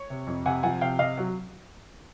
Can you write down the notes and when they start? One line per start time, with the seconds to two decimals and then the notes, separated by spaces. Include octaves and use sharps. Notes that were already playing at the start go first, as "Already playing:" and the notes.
Already playing: C#5
0.10 C3
0.27 F2
0.46 C3 F#5 G#5
0.63 F3 F#5 G#5
0.81 C3 F5 G5
0.99 C3 D#5 F5
1.17 F#3